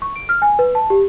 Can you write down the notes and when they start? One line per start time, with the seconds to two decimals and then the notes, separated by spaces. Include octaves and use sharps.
0.02 C#6
0.16 D7
0.29 F6
0.42 G#5
0.59 B4
0.75 A5
0.90 G4